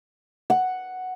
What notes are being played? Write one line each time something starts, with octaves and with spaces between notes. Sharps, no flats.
F#5